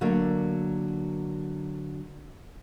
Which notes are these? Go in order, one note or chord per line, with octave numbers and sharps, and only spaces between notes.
D3 F#3 A3 A#3